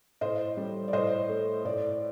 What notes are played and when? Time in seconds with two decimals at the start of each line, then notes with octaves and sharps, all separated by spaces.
0.21 A2 C5 D#5
0.57 G3
0.88 D5
0.93 A2 C5 D#5
1.29 A3
1.64 A2 D5